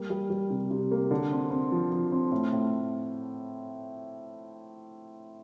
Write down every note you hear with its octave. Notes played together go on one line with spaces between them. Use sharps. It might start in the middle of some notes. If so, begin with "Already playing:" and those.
Already playing: G3 A#3
G3
G3
C3
C3
A#3
D3
C4
C4
F3
F3
C4
A2
A2